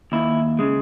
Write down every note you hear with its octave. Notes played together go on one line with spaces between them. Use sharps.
D#2 E4
C#3 G#3